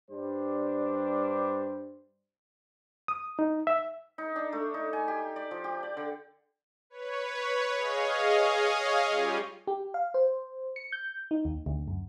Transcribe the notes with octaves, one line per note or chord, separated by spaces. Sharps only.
G2 G3 D4 C5
D#6
D#4
E5
D#4
D4
A3
D#4
G#5
G4
D5
F3
G4
D5
D3
B4 C#5
G#4 C#5 D#5 F5
G3 C#4 F4 G4
G4
F5
C5
C#7
G6
D#4
D#2
D2
F#2